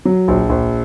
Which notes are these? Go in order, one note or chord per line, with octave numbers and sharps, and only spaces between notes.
F#3
A#1
A#1